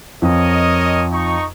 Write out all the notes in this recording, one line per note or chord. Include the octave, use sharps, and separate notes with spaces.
F2 A#4 C#5 D#5
D#4 C#6